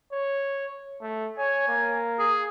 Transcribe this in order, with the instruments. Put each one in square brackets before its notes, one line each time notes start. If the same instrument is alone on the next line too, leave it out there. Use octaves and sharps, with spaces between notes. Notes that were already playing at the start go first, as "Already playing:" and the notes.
[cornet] C#5
A3
[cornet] C#5 [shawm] G#5
[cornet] A#3
[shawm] G#4